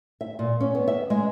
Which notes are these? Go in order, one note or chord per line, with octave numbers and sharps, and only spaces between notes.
E5
A#2
C#4
B3
E5
G#3